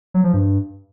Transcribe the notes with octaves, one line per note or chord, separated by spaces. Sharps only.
F#3
F3
G2